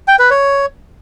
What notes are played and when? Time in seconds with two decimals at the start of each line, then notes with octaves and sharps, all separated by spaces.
0.08 G5
0.19 B4
0.30 C#5